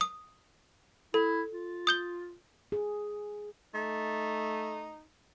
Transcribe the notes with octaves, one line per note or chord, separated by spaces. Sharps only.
D#6
E4 A4
F4
D#6 G6 G7
G#4
A3 D#4